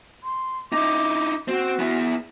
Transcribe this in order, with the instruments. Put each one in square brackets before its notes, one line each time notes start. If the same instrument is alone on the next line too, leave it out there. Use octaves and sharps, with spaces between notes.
[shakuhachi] C6
[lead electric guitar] D#4 E4 [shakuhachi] D6
[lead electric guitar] C4 [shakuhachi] F#4
[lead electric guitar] B3 E4